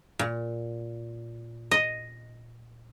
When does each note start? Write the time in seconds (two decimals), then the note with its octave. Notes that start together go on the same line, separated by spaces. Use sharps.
0.19 A#2
1.71 D#5